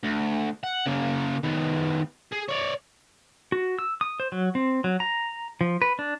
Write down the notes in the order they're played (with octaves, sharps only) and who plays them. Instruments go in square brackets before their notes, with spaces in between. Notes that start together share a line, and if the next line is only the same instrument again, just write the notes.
[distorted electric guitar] D2
F#5
C#3 A#3
D#3 B3
G#4
C#5 D5
[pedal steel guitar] F#4
E6
D#6
C5
F#3
C4
F#3
A#5
F3
B4
D4